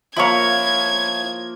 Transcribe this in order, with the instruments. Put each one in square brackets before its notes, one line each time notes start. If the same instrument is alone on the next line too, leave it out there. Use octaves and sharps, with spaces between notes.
[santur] F3 A#3 A#4 [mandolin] E4 C#5 [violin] G#6